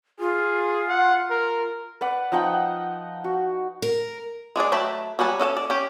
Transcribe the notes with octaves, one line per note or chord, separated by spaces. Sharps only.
F4 G#4
F#5
A#4
B4 D5 F#5
F3 D#4 F#5 G5
F#4
A#4
G#3 D4 G#4 D5
F#3 A3 G5 A5 B5
F#3 G3 F#5 G#5 A5
C#4 A4 F#5 A5
D5
C#4 G4